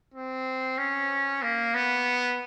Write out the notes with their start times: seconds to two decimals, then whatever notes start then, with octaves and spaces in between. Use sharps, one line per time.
0.14 C4
0.78 C#4
1.42 A#3
1.75 B3